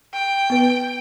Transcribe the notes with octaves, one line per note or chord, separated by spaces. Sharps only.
G5
B3 B4